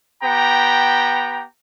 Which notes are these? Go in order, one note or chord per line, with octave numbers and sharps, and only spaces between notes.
B3 G4 G5 A#5